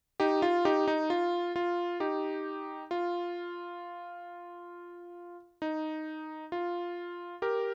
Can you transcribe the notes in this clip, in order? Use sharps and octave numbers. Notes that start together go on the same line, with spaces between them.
D#4 G4
F4
D#4 G4
D#4
F4
F4
D#4 G4
F4
D#4
F4
G4 A#4